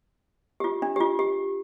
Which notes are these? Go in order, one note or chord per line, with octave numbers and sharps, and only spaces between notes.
G4
F4
D4
G4
F4
G4